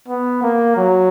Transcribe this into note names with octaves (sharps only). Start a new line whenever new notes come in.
B3
A#3
F#3